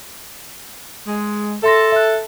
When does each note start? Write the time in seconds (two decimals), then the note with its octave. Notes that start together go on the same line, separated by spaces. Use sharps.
1.07 G#3
1.63 A4 E5 C6 A#6
1.92 E5 F#6